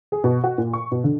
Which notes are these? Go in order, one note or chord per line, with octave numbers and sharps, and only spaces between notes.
G#4
B2
F#4
A#2
C#6
B2
D3